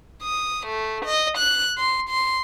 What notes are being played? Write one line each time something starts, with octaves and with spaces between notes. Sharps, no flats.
D#6
A3
D#5
F#6
C6
C6